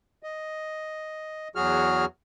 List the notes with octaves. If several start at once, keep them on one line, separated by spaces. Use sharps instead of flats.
D#5
E2 F#3 F#4 G#4 F6